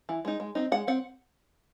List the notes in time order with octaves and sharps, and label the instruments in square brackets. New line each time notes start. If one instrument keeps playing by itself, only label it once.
[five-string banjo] E3
G#3 D#4
G#3
C4 D#4
G#3 F#5
C4 F#5